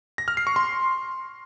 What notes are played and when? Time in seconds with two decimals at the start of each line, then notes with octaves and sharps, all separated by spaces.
0.18 A#6
0.28 F6
0.37 C7
0.47 C#6
0.56 C6